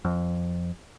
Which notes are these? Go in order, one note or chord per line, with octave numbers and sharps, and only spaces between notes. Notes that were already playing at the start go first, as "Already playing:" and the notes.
F2